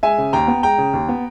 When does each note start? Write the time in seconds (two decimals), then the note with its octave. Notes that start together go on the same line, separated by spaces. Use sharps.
0.03 G#3 E5 G#5
0.18 C#3
0.33 D#2 G5 A#5
0.48 B3
0.63 G#3 G5 A#5
0.78 C#3
0.93 D#2
1.09 B3